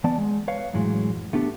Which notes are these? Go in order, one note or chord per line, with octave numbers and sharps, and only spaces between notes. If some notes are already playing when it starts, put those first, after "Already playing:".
E3 B3 D5 A5
G#3
B4 C#5 F5
F#2 A2 E3 F#3 G#3
A3 B3 D4 G4